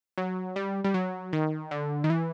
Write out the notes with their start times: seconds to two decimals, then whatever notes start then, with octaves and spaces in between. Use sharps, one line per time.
0.18 F#3
0.56 G3
0.84 G3
0.94 F#3
1.33 D#3
1.71 D3
2.04 D#3
2.10 E3